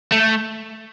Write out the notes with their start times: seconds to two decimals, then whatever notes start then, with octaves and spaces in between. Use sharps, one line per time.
0.12 A3